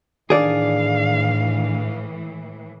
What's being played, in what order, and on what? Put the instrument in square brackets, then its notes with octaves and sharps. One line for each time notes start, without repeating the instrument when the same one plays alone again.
[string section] A2 E3 [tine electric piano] D#3 D4 [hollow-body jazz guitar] G#4 D5 [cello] F5